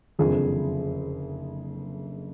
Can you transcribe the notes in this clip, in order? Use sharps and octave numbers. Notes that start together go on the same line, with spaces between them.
F#1 F2 D3 G#4